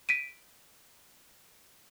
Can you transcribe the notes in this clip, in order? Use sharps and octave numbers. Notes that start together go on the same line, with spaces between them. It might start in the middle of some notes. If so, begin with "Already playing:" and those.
B6 D7 D#7